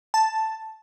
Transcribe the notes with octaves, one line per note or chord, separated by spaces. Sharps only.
A5